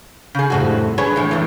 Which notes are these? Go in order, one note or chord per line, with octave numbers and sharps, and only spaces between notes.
C#3 G#4
F2 A2 C3 F#4
D4 G#4 B4 C#5
A2 E3 G#3
E2 A2 E3